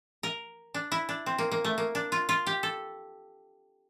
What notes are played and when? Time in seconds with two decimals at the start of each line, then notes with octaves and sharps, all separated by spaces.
0.23 A#4
0.74 D4
0.92 E4
1.09 D4
1.26 C4
1.38 A#3
1.52 A#3
1.64 A3
1.78 A#3
1.95 D4
2.12 F4
2.29 F4
2.47 G4
2.63 A4